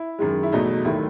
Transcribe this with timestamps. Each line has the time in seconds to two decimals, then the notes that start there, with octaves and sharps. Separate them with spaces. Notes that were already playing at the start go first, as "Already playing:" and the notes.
Already playing: E4
0.19 F#2 D#3 G#3
0.43 E4
0.52 E2 B2 F#3 A3 D#4
0.84 D#2 D#3 F#3 A3 E4